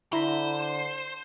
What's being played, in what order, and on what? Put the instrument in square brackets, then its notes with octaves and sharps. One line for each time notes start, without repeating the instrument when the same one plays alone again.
[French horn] D3 [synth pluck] E4 A#5 B5 [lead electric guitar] C5